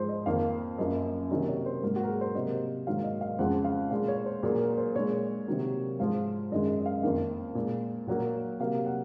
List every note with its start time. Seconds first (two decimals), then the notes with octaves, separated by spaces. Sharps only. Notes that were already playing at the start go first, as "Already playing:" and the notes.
Already playing: G#2 F3 G#3 C5
0.09 D#5
0.26 F2 D#3 A#3 F5
0.78 F#2 F3 A#3 D#5
1.30 C3 D#3 F#3 A#3 D#5
1.48 C#5
1.66 C5
1.83 G#2 F#3 A#3 A#4
1.96 F#4
2.03 A#4
2.08 G#4
2.21 C5
2.35 C3 F#3 A#3 D#5
2.87 G#2 D#3 F#3 A#3 F5
3.04 D#5
3.21 F5
3.39 F2 C#3 F3 G#3 F#5
3.64 F5
3.91 A#2 G#3 F5
4.08 C#5
4.26 C5
4.43 A#2 F#3 A#3 G#4
4.61 A#4
4.78 C5
4.95 A#2 G#3 C#5
5.47 C3 D#3 F#3 A#3
5.99 G#2 F3 G#3 F5
6.52 F#2 D#3 G#3 D#5
6.80 D#5
6.86 F5
7.03 F2 D#3 A#3 F5
7.55 A#2 G#3
8.07 A#2 F#3 A#3 F#5
8.60 C3 F#3 A#3 F5
8.86 F#5